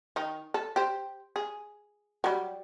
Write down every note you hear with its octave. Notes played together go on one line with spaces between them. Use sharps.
D#3 D#4
A4
G4 C5
G#4
F#3 G3